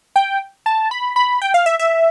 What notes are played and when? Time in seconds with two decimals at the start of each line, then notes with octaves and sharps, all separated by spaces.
0.16 G5
0.66 A5
0.91 B5
1.16 B5
1.42 G5
1.54 F5
1.66 E5
1.79 E5